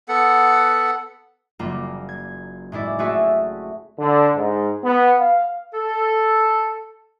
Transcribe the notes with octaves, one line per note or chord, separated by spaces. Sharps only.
B3 A4 F#5
F#1 G3 A#3 F4
G#6
A2 G#3 E4 D5
A3 C4 F#4 G#4 E5 A5
D3
G#2
B3
F5
A4